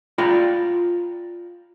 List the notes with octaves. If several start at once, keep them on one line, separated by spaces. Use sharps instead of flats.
F4 D5 G5 A#5 B5